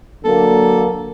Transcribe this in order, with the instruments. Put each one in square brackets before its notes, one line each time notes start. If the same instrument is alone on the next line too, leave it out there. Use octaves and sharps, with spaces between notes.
[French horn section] D3 F#3 A#3 [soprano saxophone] A4